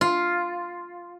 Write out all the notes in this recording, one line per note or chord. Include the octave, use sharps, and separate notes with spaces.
F4